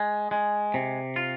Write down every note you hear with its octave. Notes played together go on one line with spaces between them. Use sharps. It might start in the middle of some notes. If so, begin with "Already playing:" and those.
Already playing: G#3
G#3
C3
F4